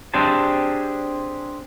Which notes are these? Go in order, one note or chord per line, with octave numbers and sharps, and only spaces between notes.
C4 D4 G4 G#4 C5 A5